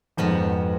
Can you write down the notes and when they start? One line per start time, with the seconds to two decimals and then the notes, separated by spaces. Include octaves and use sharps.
0.17 F2 G#2 F3 B3 F#4